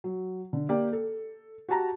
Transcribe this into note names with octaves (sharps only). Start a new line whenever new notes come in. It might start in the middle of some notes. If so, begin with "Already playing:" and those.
F#3
D3
A#3 G4 D5
A4
F#4 G4 A5 A#5